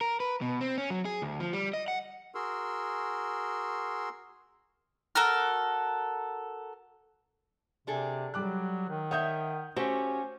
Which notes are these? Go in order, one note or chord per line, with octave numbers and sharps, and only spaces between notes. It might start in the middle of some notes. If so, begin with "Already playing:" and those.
A#4
B4
B2
C4
C#4
F#3
G#4
D2
F3
G3
D#5
F#5
F#4 G#4 A#4 C6 E6
F#4 A4 A#4 F6
C3 D4 G#4 A4
F#3 G3 D6 F#6
D#3
C#5 E5 F#5 D#6 G6
A3 C#4 F#4 G4 C5